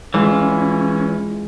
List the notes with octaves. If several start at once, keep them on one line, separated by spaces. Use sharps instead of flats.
E3 G#3 C#4 F4